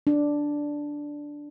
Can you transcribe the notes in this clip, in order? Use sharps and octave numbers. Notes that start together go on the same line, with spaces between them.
D4